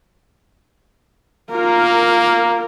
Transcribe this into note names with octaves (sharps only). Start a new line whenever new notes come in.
A#3 F4 A#4